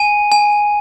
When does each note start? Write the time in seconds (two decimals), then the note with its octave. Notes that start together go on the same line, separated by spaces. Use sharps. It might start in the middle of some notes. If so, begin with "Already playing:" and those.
Already playing: G#5 D#7
0.32 G#5